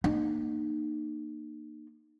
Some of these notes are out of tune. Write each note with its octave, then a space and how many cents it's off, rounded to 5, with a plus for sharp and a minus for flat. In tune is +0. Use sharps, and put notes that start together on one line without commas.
A#3 +0 D#4 -35